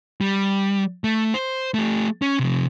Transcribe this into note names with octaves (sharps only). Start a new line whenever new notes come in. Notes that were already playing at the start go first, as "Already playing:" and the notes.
G3
A3
C5
A3 G4
C#4
C3 F3